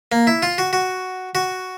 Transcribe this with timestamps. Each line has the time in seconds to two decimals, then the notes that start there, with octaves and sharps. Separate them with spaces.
0.12 A#3
0.27 E4
0.43 F4
0.58 F#4
0.73 F#4
1.35 F#4